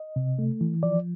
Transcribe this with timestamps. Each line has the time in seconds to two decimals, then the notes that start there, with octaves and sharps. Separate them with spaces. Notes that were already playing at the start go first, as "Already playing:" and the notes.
Already playing: D#5
0.16 C3
0.39 A3
0.61 E3
0.83 F3 D5